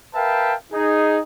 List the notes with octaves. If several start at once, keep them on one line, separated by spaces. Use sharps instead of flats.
A#4 B4 E5 F5 G5 A5
D#4 G#4